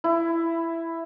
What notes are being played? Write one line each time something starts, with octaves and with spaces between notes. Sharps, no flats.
E4